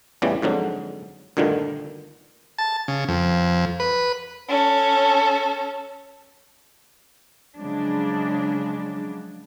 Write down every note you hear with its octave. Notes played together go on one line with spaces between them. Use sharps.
A1 E2 C#3 E3 G3
F2 G#2 D3 F#3
D2 G2 A#2 D3 D#3
A5
C#3
F2
B4
C#4 A4
C#3 F3 F#3 G#3 D4